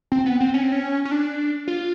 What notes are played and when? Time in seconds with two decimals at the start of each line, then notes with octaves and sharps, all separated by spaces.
0.12 C4
0.26 B3
0.40 C4
0.54 C#4
0.63 C4
0.72 C#4
1.05 C#4
1.11 D4
1.68 F4